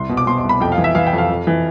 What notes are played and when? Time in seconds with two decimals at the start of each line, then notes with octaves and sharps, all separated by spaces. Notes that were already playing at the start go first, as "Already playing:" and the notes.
Already playing: C2 C6
0.09 B2
0.17 D6
0.27 B2 C6
0.38 C6
0.43 C2
0.49 B5
0.60 F2 G5
0.72 F5
0.78 E3
0.84 E5
0.95 E3 F5
1.07 G5
1.13 F2
1.18 F5
1.29 F2
1.47 E3